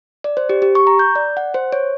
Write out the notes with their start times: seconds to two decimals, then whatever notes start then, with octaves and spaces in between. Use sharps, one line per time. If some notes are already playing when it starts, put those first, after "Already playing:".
0.24 D5
0.37 C5
0.49 G4
0.62 G4
0.75 C#6
0.87 A#5
0.99 G6
1.15 D5
1.37 F#5
1.54 C5
1.72 C#5